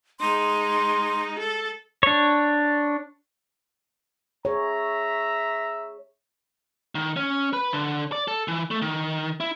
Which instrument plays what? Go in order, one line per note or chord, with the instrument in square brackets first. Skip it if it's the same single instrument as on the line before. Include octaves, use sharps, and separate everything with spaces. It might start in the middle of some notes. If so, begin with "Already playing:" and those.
[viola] G#3 D#4 [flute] C6
[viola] A4
[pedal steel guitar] D4 C#5
[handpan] G#4 C#5 [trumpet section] E5 A#5
[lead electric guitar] D#3
C#4
B4
D3
D5
A4
E3
A3
D#3
E4